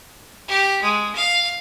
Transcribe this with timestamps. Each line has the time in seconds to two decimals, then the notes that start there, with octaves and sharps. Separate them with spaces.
0.48 G4
0.82 G#3
1.15 F5